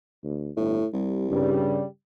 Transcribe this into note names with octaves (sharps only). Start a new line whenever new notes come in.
D2
G1 A2
C2 G3
G2 C#3 G3